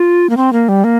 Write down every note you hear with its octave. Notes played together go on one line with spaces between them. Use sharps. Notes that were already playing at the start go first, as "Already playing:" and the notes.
Already playing: F4
A#3
C4
A#3
G3
A#3